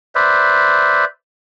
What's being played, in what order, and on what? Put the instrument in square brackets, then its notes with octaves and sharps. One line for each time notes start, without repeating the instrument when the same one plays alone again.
[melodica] B4 C5 D5 E5